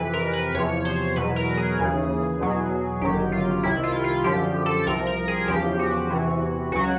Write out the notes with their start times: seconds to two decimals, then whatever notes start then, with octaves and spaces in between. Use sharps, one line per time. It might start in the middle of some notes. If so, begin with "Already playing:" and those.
Already playing: F2 C3 E3 B4
0.13 A#4
0.34 B4
0.54 E2 C3 F3 C#5
0.85 C5
1.16 E2 B2 F#3 B4
1.36 A#4
1.57 G#4
1.78 D#2 C#3 E3
2.40 E2 B2 F#3
3.01 G1 F#2 D#3 F#3 G4
3.32 F4
3.63 C2 C3 D#3 E4
3.83 F4
4.04 F4
4.24 F#2 D3 F3 G4
4.66 A4
4.86 C2 C3 F3 A#4
5.07 A#4
5.28 G#4
5.48 E2 C#3 F3 G4
5.79 F#4
6.10 E2 C3 E3
6.72 C#2 C#3 F#3 F#4